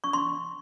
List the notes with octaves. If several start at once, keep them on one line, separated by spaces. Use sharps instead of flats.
C#6
C6